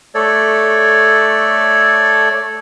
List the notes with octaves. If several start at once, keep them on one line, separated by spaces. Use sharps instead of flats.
A3 A4 C#5 D5